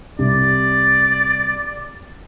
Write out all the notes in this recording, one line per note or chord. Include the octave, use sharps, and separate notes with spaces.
C2 D5